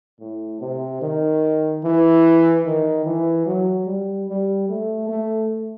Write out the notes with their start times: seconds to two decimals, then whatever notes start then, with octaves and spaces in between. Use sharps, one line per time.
0.20 A2
0.60 C3
1.01 D#3
1.83 E3
2.65 D#3
3.05 E3
3.46 F#3
3.87 G3
4.28 G3
4.69 A3
5.09 A3